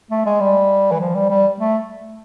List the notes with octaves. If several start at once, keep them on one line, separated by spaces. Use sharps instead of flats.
A3
G#3
G3
E3
F3
G3
G3
A3